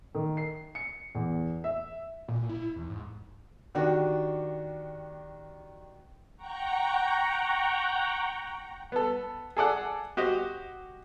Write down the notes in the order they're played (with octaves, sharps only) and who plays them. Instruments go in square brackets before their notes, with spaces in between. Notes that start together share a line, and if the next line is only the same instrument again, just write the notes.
[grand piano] D#3
C7
C#7
E2
E5
[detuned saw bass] A#2
E4
E2
G#2
[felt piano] D#3 D4 F#4 G4
[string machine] F#5 G5 A#5 C#6
[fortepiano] B3 A4
G#4 A4 D5 F#5
F#4 G4 C5 D#5